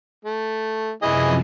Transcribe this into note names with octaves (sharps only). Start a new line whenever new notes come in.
A3
F#2 C3 E3 F3 G#4 D#5